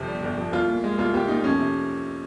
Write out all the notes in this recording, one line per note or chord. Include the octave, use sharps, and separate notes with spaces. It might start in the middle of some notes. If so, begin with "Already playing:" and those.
Already playing: G1 F2 C3
G3
G1
F2
C2 F4
A#2
G#3
C2 F4
C2 G4
A#2 D#4
F2 C#4
C3